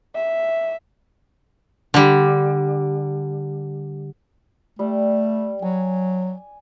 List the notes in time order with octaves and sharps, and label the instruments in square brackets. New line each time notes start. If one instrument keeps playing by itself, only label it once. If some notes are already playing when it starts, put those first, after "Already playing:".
[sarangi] E5
[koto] D3 G3
[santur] G3 [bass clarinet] A3
[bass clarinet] F#3 [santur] G#5